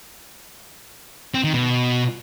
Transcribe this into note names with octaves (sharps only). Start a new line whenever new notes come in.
C4
D#3
B2